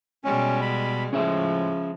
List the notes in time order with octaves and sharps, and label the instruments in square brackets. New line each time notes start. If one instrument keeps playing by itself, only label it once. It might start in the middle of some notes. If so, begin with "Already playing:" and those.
[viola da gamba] B2 G3 G#3 [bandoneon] C#4
[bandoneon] B5
[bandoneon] A2 [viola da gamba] C#3 F3 G#3 [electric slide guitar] C#4 G#4 E5